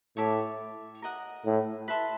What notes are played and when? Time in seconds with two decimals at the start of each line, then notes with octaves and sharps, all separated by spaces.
0.17 A2 C#5 E5 A5 D6
1.02 A#4 D#5 F#5
1.45 A2
1.88 B4 E5 A5 C6